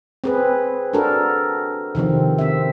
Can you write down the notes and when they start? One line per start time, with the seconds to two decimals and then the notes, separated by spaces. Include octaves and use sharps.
0.24 C4 G#4 B4
0.93 D4 F#4 A4 A#4
1.95 C3 D#3 F3 C4
2.39 C4 E5